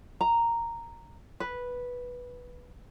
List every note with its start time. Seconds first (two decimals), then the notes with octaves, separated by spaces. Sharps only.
0.21 A#5
1.40 B4